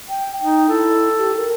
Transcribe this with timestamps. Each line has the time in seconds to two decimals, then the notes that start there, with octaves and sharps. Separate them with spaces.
0.09 G5
0.41 D#4 G5
0.69 E4 A4
1.18 G4
1.37 A#4